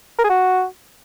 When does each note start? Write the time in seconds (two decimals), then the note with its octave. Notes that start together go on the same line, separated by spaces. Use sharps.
0.18 A#4
0.24 G#4
0.30 F#4